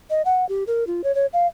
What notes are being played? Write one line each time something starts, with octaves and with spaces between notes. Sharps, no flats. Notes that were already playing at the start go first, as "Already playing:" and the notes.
D#5
F#5
G4
A#4
F4
C#5
C#5
F5